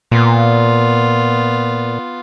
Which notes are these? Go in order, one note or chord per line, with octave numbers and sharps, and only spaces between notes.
A#2 B3 F4